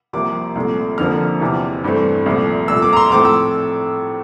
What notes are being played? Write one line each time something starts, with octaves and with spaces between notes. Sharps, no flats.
C2 C3 F3 A#3 D6
C2 A#2 A3
F2 D3 F3 A#3 F6
E2 C3 E3
G2 E3 A3 C4
C2 A#2 F3 A3
C2 A#2 A3 E6
D6
A#5
C6
A2 F3 A3 C4 D6
E6